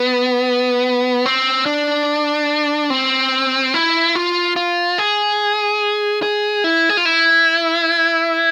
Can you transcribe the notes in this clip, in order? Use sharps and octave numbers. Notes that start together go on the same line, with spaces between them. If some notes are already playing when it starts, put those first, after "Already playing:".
Already playing: B3
C4
D4
C4
E4
F4
F4
G#4
G#4
E4
G#4
F4
E4